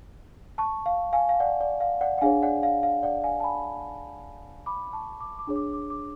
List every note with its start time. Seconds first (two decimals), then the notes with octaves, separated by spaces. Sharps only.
0.58 A5 C#6
0.86 F5
1.13 F5 G#5
1.29 F5
1.40 D5 F#5
1.61 D5
1.80 F5
2.01 D5 F#5
2.18 F#5
2.21 D4 G#4 C#5 F5 G#5
2.42 D5 F#5
2.63 F5
2.83 F5
3.03 D5 F#5
3.24 F5 G#5
3.40 A5
3.43 G#5 B5
4.66 B5 D6
4.93 A5 C#6
5.20 D6
5.39 D6
5.47 D4 G#4 C#5
5.56 D6
5.73 D6
5.90 D6